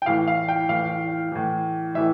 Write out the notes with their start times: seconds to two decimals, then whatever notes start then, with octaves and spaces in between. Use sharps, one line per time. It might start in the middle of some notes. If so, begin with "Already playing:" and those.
0.02 G5
0.06 A2 E3 F5
0.28 F5
0.48 G5
0.69 A2 E3 F5
1.32 A2 E3
1.95 A2 E3 E5